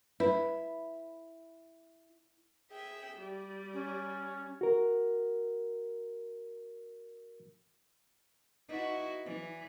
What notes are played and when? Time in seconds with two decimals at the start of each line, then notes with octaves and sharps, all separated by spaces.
0.20 E4 B4
2.71 G#4 E5 G5
3.18 G3
3.74 C#4
4.61 F#4 A#4
8.69 D#4 E4 F#4 B4 D5
9.26 E3 D5